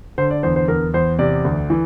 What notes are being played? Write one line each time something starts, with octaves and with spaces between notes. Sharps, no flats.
D3 C5
D5
E2 C5
C5
E2 A#4
E2 C5
C3 D5
D2
E3